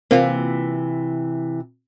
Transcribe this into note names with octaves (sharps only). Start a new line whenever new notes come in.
C3 E3 A#3 C4 F4